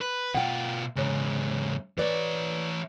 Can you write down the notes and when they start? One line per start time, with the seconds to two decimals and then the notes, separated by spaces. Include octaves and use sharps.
0.01 B4
0.35 B2 F4 F#5 G5
0.96 E2 G#2 C#3 C#5
1.98 E3 B4 C#5 D5